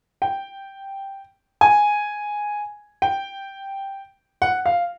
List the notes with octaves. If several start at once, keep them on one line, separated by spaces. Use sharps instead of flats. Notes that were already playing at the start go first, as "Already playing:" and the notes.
G5
G#5
G5
F#5
F5